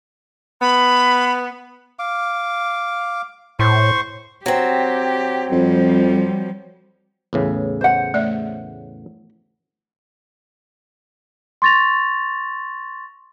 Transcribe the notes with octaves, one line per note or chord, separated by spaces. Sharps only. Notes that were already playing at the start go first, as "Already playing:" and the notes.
B3 B5
F5 D6
A2 C5 C6 C#6
F#3 C4 G4
F2 F3 G3
E2 A2 C#3
C5 F#5
A3 D5 E5
C6 C#6 A6 A#6 F7